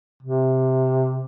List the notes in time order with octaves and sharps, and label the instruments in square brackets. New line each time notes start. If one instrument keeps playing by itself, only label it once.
[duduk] C3